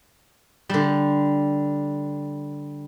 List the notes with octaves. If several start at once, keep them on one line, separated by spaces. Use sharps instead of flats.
D3 G3